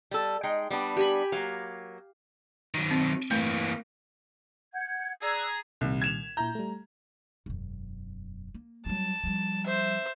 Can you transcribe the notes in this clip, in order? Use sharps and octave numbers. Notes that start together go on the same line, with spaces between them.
G3 A4
G#3 D#4 G5
G3 B3 D4
G4 G#5 B5
F#3 A#3 F5
D#3 F#3
C4
E3 A3 A#3
F#5 G6 G#6
G#4 D5 A#5 E6 F#6
C2 A#2 D#3 G3
G#6 E7 F7
A#2 E4 A#5 G6
G3 A3
E1 F#2
A#3
F#3 G3 A5
F3 G3
C5 E5